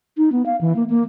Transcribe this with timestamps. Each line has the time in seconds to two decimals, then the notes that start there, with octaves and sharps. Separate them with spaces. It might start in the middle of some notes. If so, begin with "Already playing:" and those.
0.18 D#4
0.32 B3
0.46 F5
0.61 E3
0.76 A#3
0.89 A#3